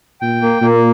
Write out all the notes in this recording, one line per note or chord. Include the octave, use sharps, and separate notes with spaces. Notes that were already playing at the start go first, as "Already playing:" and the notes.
A#2 G5
A#3
A#2 A#3